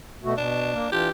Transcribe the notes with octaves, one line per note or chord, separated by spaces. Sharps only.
B2 A3 F#4
B2 D4
A#3
E3 D4 F4 G4